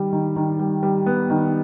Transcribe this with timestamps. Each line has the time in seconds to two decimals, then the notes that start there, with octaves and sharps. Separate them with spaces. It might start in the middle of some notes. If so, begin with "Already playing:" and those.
Already playing: D#3 G3
0.12 D#3
0.36 D#3
0.59 G3
0.83 G3
1.06 B3
1.30 D#3